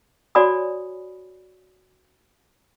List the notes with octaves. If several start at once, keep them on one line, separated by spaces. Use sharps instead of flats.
F#4 C#5 D5 G#5 B5 D#6